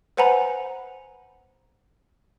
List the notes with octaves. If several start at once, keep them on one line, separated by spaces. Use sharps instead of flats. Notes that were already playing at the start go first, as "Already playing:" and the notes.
B4 C5 F#5 G#5 A#5 B5